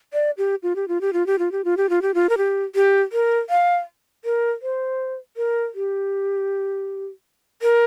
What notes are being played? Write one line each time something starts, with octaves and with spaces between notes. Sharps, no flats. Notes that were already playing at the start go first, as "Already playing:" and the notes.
D5
G4
F4
G4
F4
G4
F4
G4
F4
G4
F4
G4
F4
G4
F4
A#4
G4
G4
A#4
F5
A#4
C5
A#4
G4
A#4